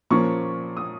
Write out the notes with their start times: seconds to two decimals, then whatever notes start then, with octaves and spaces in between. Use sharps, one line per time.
0.10 A#2 F3 A#3 C#4 C#6
0.77 D#6